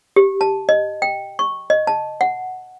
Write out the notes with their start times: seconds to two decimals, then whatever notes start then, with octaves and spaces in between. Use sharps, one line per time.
0.16 G4
0.41 A5
0.69 D#5
1.02 G5
1.39 C#6
1.70 D#5
1.87 A5
2.21 F#5